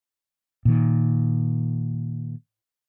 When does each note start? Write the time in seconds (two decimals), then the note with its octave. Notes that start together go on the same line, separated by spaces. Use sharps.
0.65 A#2 D#3